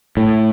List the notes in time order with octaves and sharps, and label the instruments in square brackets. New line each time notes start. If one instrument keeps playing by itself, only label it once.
[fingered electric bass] A2